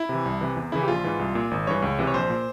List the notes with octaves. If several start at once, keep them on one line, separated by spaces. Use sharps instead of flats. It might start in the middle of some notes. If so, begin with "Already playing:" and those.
Already playing: E4
C3 E3
C2
C3 E3
E2
C#3 E3 E4
G4
A#1 F4
G#2 E3
C2
A#2
G#1
G2 E3 C#5
C#2
C3 E3
C#5
A#1 C5
A#2